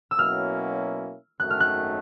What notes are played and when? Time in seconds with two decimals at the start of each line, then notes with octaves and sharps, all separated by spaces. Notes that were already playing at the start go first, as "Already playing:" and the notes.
0.11 E6
0.19 B2 F#3 A#3 C#4 E4 F6
1.40 G#1 F#2 D#3 F#3 A3 F#6
1.50 F6
1.60 F#6